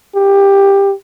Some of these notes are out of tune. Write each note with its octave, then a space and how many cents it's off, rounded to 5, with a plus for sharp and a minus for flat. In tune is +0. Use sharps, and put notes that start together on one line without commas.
G4 +15